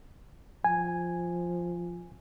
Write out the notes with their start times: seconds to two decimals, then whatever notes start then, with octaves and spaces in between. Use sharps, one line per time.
0.64 F3 G#5